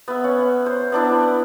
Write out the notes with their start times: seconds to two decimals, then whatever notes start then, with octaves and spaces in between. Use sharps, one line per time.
0.08 B3 E5
0.24 C#4 F#5
0.66 C5
0.92 B3 D4 E4